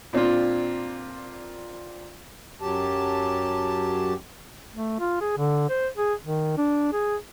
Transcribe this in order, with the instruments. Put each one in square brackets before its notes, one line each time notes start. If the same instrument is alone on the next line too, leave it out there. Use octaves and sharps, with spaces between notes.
[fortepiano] A#2 C4 D4 F4
[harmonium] F#2 F#3 G4 A5
[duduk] A3
F4
G#4
D3
C5
G#4
D#3
D4
G#4